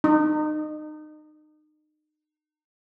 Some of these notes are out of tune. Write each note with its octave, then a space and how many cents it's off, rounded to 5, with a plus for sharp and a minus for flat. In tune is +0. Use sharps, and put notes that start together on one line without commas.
D#4 -30